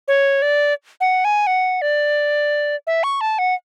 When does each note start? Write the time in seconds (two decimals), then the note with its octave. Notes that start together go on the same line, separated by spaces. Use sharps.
0.08 C#5
0.42 D5
1.01 F#5
1.25 G#5
1.47 F#5
1.82 D5
2.87 E5
3.04 C#6
3.21 A5
3.39 F#5